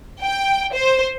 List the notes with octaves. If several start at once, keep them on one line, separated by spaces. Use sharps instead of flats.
G5
C5